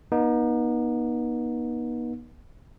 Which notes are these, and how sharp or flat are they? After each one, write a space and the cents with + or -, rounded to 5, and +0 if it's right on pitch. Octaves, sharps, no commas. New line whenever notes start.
B3 -40 D#4 +0